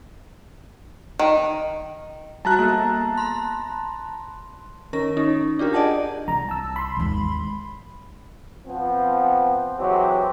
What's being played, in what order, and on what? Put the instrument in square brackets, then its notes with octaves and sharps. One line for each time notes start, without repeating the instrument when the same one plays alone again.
[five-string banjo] D#3
[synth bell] G3 F#4 [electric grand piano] A5 A#5 F#6
[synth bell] A#3 B3
B5 C6
D#3 C#4 A#4 A#6
C#4 D#4
D4 F4 G4 A#4
G#4 D5 D#5 F#5 A5
[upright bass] C2 [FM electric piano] A#5
[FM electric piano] A5 E6
B5 C6
[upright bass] G#1 D#2
[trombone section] F3 B3 C4
E3 F#3 G#3 C4 G4